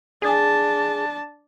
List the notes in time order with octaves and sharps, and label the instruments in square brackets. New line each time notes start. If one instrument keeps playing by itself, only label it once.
[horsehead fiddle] D4 A5 [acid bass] G#4